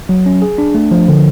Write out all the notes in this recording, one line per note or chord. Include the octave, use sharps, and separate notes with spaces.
F#3
C#4
G#4
D4
A3
F3
D3